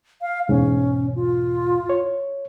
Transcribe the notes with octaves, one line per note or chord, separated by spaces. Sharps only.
F5
E2 G#2 B2 C#4
F4
C#5